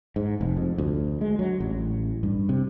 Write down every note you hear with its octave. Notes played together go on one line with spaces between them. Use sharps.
G#2
F1
F2
D2
G#3
F#3
A1
G2
C3